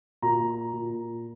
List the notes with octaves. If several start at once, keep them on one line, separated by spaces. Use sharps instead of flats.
A#2 A#5
A#2